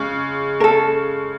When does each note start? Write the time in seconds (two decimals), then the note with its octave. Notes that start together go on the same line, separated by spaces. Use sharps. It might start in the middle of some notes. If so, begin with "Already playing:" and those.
Already playing: C#3 G#3
0.60 A#4
0.64 A4